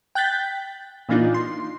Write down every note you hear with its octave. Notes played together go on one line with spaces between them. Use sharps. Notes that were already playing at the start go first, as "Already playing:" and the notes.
G5 F#6 G6 A6 B6
A#2 E3 A#3 D4 D#4 F4
C6